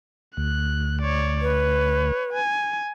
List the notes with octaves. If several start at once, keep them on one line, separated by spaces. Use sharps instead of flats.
D2 F#6
C#5 D5
B4 C#5
G#5